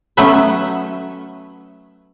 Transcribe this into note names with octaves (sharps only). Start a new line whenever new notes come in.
F#3 A3 B3 C#4 B4 E5